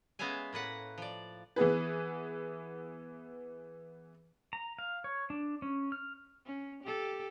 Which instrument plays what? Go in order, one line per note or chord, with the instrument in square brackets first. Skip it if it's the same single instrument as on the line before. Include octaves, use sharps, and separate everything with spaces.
[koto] G#3 B3 C#4 E5 F5 G#5
A2 A#3 B4 F#5
F3 D5
[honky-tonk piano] E3 B3 G#4 B4
[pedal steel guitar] A#5
F5
C#5
D4
C#4
F6
[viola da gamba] C#4
G4 A4